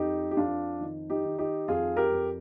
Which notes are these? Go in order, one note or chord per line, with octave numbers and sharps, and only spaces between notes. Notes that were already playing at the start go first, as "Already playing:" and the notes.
Already playing: F2 D#4 G4
G4
F2 D4 F4
D#3
D#4 G4
D#3
D#4 G4
F2 F4 G#4
G4 A#4
F2